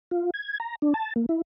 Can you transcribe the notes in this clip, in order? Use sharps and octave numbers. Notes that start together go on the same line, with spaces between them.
F4
G#6
A#5
D4
A5
A#3
E4